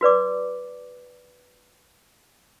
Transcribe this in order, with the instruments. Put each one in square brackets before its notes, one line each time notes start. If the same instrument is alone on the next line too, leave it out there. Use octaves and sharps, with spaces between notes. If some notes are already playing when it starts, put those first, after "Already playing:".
[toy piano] F#4 B4 D5 D6